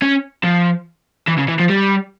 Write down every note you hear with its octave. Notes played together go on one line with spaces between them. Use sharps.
C#4
F3
E3
C#3
E3
F3
G3